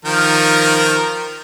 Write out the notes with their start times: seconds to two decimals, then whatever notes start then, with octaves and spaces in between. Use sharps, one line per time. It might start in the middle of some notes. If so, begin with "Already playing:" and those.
0.05 D#3 F3 A#4